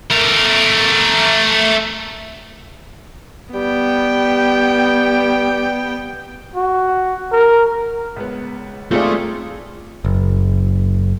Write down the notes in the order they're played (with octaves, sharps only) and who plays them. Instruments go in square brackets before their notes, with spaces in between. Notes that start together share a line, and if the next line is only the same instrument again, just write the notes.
[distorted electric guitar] A3 A#4
[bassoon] G3 [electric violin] B3 G5
[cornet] F#4
A#4
[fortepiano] C#2 B3
[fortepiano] D#2 C4 [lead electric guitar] A3 [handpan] F4 G#4 D5
[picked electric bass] F#1